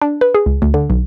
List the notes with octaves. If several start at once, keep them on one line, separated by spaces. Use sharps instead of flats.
D4
B4
G#4
C#2
D2
D3
B1